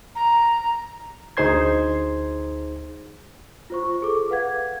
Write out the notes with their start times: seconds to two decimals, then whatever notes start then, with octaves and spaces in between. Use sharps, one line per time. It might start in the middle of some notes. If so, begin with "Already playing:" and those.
0.15 A#5
1.37 D2 D#4 G#4 C5 C6 G#6
3.70 F4 C5 C#6
4.02 G#4 A4 D6
4.30 B4 F5 F#5 G#6